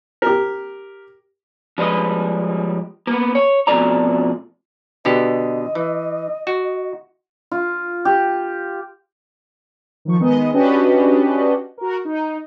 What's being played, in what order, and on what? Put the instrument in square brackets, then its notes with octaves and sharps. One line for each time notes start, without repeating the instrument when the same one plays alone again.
[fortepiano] G4 A#4
[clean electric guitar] F3 G3 G#3 A#4 B4 D#5
A#3 B3
C#5
F2 B2 A3 D5 A#5
[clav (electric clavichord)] B2 D3 G4 [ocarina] D#5
[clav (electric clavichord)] E3
F#4
[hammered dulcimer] F4
G4
[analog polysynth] D#3 F3 C#6
D#3 G#3 B3 D#5
C#4 D4 F#4 G4 B4 D#5
F#4 A#4
D#4